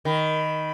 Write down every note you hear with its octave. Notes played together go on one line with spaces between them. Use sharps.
D#3 B5